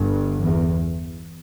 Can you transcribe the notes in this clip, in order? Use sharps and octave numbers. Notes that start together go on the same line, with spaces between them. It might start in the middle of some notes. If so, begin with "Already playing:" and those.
Already playing: G1 G2
E2